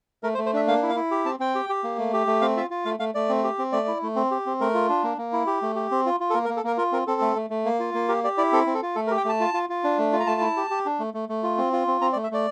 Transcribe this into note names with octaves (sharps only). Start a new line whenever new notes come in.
A3 A#4
C5
A3
C5
D4 E5
A#3 F5
E4
F5
E4
G4
C4 A5
C4 G5
G4
G4
A#3
A3
G4
A3
C4 F5
F4 E5
F4
A3 F5
A3 F5
A3 D5
C4
G4
C4
A3 D5
E4
A3
C4
G4
C4
A3 A#4
F4
D4
A#3
A#3
E4
G4
A3
G4
C4
F4
F4
A4
A#3 A#4
A#4
A#3
A4
A#3 A#4
F4 A#4
C4 A#4
C4 A4
A3
A3
A3
A#3
F4
A#3
G4 A#4
G4 D5
E4 D5
C4 A4
C4
A4
F4
A3 A4
A#4
G4
G5
A3 A5
F4
F4
F4
D4
A3
F4
A#5
A3 A5
E4
G4
G4
D4
A3
A3
A3
F4
C4
F4
C4
C4 A#5
D5
A3
E5
A3 D5